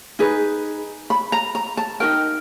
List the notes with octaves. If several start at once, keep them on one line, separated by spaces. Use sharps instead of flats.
D#4 G#4 B4
B5
A#5
A#5
A5
D#4 F#4 A#4 G5